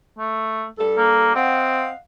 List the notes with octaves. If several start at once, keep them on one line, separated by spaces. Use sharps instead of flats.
A3
G2 G3 A4
A#3
C4 D#5 F5 F#5